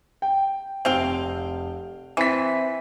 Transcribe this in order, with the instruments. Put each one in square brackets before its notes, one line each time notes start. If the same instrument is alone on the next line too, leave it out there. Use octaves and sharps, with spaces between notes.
[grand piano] G5
[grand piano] F1 F7 [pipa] C4 F5 G5
[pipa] E3 [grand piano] C4 B6